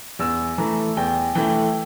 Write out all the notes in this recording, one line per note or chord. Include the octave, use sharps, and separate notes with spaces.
E2 E6
E3 A3 A#5
E2 G5
E3 A3 G5